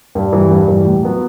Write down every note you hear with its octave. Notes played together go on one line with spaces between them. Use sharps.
G2
E3 G3
G2
E3 G3
A2
F#3 B3 F#4